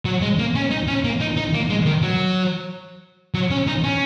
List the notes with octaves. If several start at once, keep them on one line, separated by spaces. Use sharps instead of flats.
F#3
G#3
A#3
C#4
D#4
C#4
A#3
D#4
D#4
A#3
G#3
D#3
F#3
F#3
C#4
D#4
C#4